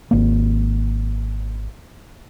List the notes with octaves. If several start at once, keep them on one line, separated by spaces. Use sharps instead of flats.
G#1 A#3